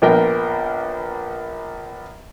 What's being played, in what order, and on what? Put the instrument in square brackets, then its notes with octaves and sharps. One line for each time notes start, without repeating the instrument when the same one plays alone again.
[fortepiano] A#1 B3 A#4 G5